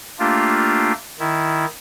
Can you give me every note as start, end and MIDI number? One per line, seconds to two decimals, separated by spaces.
0.19 0.92 57
0.19 0.92 58
0.19 0.92 62
0.19 0.92 65
0.19 0.92 67
1.19 1.66 51
1.19 1.66 64